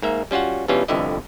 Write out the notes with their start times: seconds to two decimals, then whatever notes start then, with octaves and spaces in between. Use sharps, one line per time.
0.02 G#2 A#3 E5
0.31 G3 C#4 F4 F#4 F#5
0.68 G2 B2 E3 G3 C#4 F4
0.88 G1 C2 F2 D3 E4 D#5